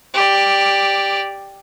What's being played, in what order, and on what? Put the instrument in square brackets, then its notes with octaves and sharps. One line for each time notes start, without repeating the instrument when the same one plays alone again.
[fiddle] G4 D5